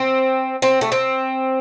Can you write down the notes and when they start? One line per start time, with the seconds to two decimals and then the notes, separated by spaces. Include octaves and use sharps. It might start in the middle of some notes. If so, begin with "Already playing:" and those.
Already playing: C4
0.62 C4
0.81 A3
0.92 C4